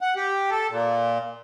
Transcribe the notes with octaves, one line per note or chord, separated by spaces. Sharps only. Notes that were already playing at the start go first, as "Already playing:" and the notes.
F#5
G4
A4
A#2